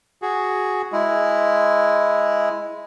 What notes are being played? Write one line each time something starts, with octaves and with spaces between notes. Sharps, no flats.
F#4 G#4
G#3 E4